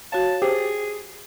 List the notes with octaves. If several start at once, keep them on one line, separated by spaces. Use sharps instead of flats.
F#4 C#5 F5 A5
G4 G#4 C5